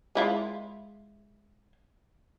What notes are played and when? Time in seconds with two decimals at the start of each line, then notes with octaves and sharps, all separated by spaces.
0.15 G#3 E4 F4